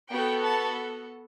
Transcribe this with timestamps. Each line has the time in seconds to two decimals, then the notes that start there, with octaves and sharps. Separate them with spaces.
0.13 B3 F#4 A4 G5
0.44 A5